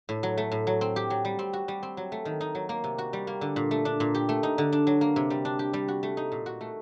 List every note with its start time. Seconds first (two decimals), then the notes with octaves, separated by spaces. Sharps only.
0.09 A2
0.23 F#3
0.37 A3
0.52 A2
0.67 F#3
0.81 C4
0.96 G4
1.10 F#3
1.25 G3
1.39 C4
1.53 F#4
1.68 G3
1.83 C4
1.97 F#3
2.12 A3
2.25 D#3
2.41 D#4
2.55 F#3
2.69 A#3
2.84 C3
2.98 F#4
3.13 G3
3.27 A#3
3.41 D3
3.56 A#2
3.71 A3
3.85 D4
4.00 A#2
4.15 G4
4.29 A3
4.43 D#4
4.58 D3
4.72 D4
4.87 F#3
5.01 A#3
5.16 C3
5.30 G3
5.45 D4
5.59 G4
5.73 G3
5.88 F#4
6.03 A3
6.17 D#4
6.32 A#2
6.46 F#4
6.61 A3